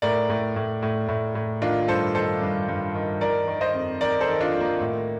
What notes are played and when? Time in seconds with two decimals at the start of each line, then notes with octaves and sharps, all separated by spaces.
0.02 A2 A#4 D5
0.30 A2
0.56 A2
0.82 A2
1.09 A2
1.35 A2
1.62 D#3 D4 F4
1.88 G2 A4 C5
2.14 D#3 A4 C5
2.41 G2
2.69 G2
2.95 D#3
3.21 D#3 A#4 D5
3.47 D#3
3.61 C5 D#5
3.74 F2
4.01 D#3 A#4 D5
4.21 A4 C5
4.28 D#3
4.41 D4 F4
4.54 D#3
4.60 A#3
4.81 A2